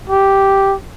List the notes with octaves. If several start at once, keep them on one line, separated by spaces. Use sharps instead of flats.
G4